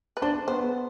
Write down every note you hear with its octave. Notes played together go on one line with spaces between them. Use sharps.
B4
D4 C5
B3 C5